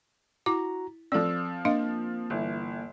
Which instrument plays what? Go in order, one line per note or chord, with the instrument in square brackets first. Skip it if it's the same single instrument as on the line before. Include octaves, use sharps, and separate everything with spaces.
[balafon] E4 D6 [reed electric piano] F#4 A#5
[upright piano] F3 C4 [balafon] A4 D5 [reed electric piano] E6
[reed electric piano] A#3 [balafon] D4 D#5 F5
[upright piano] G1 E3